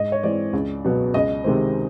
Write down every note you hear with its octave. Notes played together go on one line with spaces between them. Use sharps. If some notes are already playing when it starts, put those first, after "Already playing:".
Already playing: G#2 D#5
C#5
E3 G#3 C4 D5
C#2
B2 F#3 B3
C#2 D#5
C3 D#3 G#3 C4